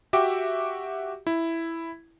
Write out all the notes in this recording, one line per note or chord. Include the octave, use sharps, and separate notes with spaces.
F#4 G4 E5 G5 D6
E4